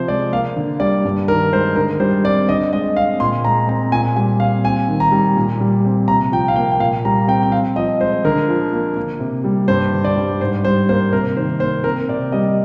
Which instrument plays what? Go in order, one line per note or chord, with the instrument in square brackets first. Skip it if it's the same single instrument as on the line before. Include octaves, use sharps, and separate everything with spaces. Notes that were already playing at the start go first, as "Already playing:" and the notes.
Already playing: [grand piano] C3 F3 C4 C5
G#3 D5
A#3 F5
D3
G3 D5
G2
D#3 A#4
G#3 C5
D3 A#4
G3 C5
C4 D5
D3 D#5
G#3 D#5
C4 F5
A#2 C6
G#3 A#5
C4 A#5
A#2 G#5
G3 G#5
C4 F5
C4 G#5
D#3
A#5
G3
A#2
G3
C4
C3 A#5
F3 G5
F5
A#3 G5
G5
A#2 F5
G3 A#5
C4 G5
G5
C4 F5
F3 D#5
G#3 C5
D3 A#4
F3
A#3
A#3
C3
G3
G2 C5
D3
D5
G3
G#2 C5
G3 C5
A#3 C5
C3 A#4
D#3 C5
A#3 C5
C4 A#4
C3 D5
G3 D#5